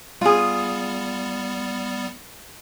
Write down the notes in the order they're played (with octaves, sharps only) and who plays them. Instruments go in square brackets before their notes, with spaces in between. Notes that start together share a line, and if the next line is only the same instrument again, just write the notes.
[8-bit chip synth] G3 B3 [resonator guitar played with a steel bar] F4 G#4